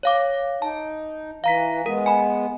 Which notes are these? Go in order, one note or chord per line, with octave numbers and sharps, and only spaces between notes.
C#5 F5 D6
D#4 A5
E3 F5 A#5 B6
G#3 B3 A#4
G#5 B5